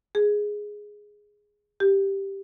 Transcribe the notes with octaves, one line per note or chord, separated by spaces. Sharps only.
G#4
G4